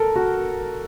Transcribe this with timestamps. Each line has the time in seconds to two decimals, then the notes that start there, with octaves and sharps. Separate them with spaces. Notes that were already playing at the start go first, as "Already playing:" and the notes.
Already playing: A4 A#4
0.16 F#4